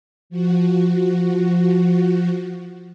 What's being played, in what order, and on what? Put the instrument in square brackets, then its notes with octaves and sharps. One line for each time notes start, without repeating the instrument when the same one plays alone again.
[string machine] F3 F#4